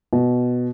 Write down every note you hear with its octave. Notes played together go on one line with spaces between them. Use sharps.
B2